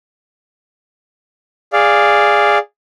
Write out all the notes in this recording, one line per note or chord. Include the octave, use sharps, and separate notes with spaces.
G#4 D5 F5